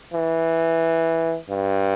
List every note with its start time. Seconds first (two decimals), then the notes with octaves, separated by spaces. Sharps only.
0.14 E3
1.50 G2